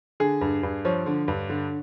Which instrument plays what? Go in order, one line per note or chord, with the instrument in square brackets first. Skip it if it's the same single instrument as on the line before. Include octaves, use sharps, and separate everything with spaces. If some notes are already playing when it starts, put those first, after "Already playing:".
[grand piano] D3 G#4
G2
G2
F3 C#5
D3
G2
D3